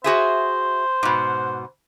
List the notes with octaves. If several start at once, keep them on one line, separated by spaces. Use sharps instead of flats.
F#4 G#4 C5 E5
G#2 B2